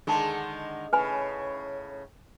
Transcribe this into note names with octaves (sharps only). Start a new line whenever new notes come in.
D3 D#3 G#3 G#4 A5
A2 C#3 B4 G#5 B5